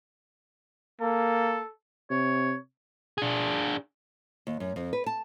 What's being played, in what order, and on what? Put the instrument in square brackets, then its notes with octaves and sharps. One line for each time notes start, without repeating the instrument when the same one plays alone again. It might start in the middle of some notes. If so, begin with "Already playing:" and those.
[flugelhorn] A#3 [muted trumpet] A4
[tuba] C3 [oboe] C#5
[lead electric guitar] D4 G#4
[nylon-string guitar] D#2
F#2
F2
B4
A5